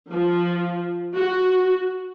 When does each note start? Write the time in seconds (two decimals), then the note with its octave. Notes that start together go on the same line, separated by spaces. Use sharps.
0.13 F3
1.14 F#4